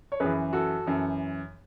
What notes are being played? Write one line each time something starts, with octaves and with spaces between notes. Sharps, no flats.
C#5
F#2 E3 G#4 B4
F#4 A4
F#2 E3